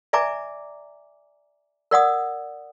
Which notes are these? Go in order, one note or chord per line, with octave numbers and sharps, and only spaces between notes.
D5 E5 G#5 A#5 D6
A#4 D5 F#5 D#6